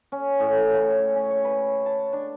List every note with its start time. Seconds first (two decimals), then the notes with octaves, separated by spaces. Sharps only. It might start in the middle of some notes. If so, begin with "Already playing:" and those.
0.12 C#4
0.40 A2
0.74 C#3
0.98 C#5
1.15 C#4
1.31 C#5
1.44 B4
1.86 A5
2.13 D4